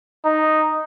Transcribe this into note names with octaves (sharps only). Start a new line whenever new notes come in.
D#4